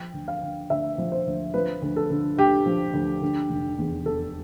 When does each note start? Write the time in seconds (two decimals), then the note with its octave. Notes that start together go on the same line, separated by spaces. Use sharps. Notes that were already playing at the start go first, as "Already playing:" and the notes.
Already playing: F3 G5
0.13 D2
0.28 F5
0.43 D3
0.70 D2 E5
0.98 F3
1.12 C5
1.27 D2
1.54 F3 B4
1.82 D2
1.96 A4
2.10 D3
2.37 D2 G4
2.66 F3
2.94 D2
3.21 D3
3.50 F1
3.78 E2
4.05 F1 A4